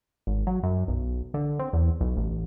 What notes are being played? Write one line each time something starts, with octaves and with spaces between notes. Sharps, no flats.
G#1
F#3
F#2
B1
D3
C4
E2
B1
A1